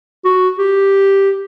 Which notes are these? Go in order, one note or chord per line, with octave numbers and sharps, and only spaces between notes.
F#4
G4